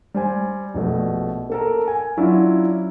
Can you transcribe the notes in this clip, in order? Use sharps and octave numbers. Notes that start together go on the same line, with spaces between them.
G3 C5 G#5
A#1 B2 A3
A#3 A4 A#4
G#5
F#3 C#4 D4 E4 F4